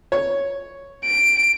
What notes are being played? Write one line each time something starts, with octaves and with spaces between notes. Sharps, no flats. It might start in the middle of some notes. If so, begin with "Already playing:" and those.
C#5
D7